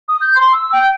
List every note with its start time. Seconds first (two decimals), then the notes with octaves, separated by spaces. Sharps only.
0.08 D#6
0.21 G6
0.35 C6
0.53 E6
0.72 G5